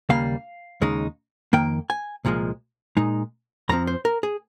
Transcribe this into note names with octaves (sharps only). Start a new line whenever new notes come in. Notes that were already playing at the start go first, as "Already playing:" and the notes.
D#2 C#3 G3 A#3 F5
D#2 C#3 G#3 D#4
F2 D#3 A#3 G5
G#5
C2 A#2 F3 G#3
A#2 G#3 D#4
F2 C#3 F3 C4 A#5
C5
A#4
G#4